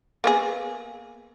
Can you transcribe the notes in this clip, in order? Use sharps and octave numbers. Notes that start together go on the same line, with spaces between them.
A#3 B3 G#4